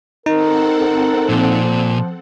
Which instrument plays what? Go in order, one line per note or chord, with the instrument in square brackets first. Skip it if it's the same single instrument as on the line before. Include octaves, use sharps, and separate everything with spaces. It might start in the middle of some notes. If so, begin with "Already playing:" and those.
[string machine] C4 A4 F#5 [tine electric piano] D#4 [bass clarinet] A#4
[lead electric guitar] A#2 [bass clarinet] F3